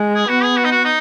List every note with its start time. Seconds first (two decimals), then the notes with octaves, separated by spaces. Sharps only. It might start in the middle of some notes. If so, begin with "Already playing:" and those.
Already playing: G#3
0.15 G#4
0.29 B3 F#4
0.43 G#4
0.57 F#4
0.64 D#4
0.71 F#4
0.85 D#4